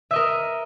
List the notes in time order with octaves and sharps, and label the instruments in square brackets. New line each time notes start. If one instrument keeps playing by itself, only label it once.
[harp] E5
D#5
A#4